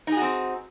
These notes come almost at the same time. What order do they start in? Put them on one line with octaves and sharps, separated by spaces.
D#4 G#4 F#4 C4